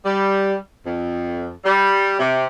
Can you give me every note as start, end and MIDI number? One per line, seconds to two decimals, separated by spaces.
0.05 0.54 55
0.86 1.50 41
1.65 2.19 55
2.19 2.45 48